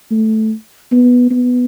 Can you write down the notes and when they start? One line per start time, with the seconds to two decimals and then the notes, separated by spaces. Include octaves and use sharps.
0.11 A3
0.92 B3
1.31 B3